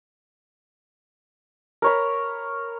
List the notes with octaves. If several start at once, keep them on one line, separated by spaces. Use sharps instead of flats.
A#4 C#5 B5